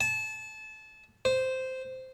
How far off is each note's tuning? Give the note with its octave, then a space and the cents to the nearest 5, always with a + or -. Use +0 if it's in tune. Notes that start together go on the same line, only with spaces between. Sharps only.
A5 -25
C5 -10